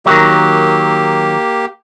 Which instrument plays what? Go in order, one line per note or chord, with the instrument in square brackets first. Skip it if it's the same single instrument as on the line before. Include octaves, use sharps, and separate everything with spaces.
[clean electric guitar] D#3 F#3 [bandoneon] A#3 G4